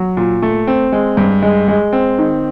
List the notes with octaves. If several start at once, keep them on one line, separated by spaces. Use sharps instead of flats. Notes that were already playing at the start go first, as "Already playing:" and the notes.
Already playing: F#3
A#2
A3
C4
G#3
G2
G#3
G#3
C4
D#3